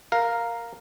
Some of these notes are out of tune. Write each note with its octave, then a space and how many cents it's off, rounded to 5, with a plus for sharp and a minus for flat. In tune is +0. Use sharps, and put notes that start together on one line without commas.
A#4 +0 F5 +5